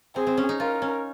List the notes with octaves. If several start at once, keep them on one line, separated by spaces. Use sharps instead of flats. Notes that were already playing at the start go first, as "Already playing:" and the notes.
C4 G#4
C4
C#4
D#4
F4 A#4
C#4